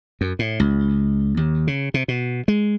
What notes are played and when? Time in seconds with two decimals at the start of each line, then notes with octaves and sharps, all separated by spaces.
0.21 F#2
0.39 A2
0.60 C#2
1.37 D#2
1.67 C#3
1.94 C3
2.08 B2
2.48 G#3